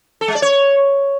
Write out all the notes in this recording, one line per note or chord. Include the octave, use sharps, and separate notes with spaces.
A4
G#3
D5
C#5